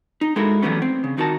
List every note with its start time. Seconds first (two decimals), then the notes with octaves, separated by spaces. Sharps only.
0.21 D#4
0.36 G#3 D#4 E4 F#4 A4 A#4
0.62 E3 F#3 G3 A3 B3 C#4
0.82 C4
1.04 C#3
1.17 D#3 D#4 F#4 A#4 A5